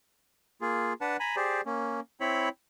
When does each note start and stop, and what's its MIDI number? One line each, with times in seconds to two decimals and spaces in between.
0.61 0.93 58
0.61 0.93 65
0.61 0.93 68
1.01 1.17 62
1.01 1.17 71
1.01 1.17 78
1.01 1.17 81
1.20 1.36 80
1.20 1.36 82
1.20 1.36 83
1.36 1.61 67
1.36 1.61 68
1.36 1.61 72
1.36 1.61 74
1.66 2.00 58
1.66 2.00 61
2.21 2.49 60
2.21 2.49 64
2.21 2.49 73
2.21 2.49 83